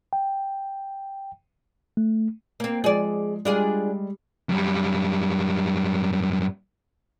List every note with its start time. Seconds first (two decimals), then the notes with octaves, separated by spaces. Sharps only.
0.13 G5
1.97 A3
2.60 A#3 C4
2.84 F3 G#3 G#4 D5
3.45 G3 G#3 D4 F4 G#4
4.49 F#2 G3